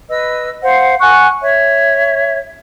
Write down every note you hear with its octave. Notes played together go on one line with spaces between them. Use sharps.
B4 D#5 E6
C5 F5 F#5
F#5 G#5 C#6 F#6
C#5 E5